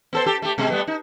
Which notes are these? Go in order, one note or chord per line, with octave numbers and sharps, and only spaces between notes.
B3 A4 C5
G4 A4
A3 G4
B2 G#3
G3 A3 B3
D#4